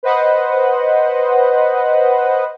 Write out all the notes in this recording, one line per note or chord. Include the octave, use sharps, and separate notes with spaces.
B4 C5 D#5 F#5